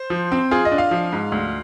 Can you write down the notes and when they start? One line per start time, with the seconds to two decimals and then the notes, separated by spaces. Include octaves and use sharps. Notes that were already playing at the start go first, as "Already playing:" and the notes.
Already playing: C5
0.10 F3
0.32 C4
0.51 F4 G#4
0.65 D#5
0.72 D4
0.78 F5
0.91 F3
1.13 G#2
1.32 D2